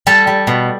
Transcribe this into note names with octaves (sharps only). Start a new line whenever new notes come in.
G3 A4
G3
B2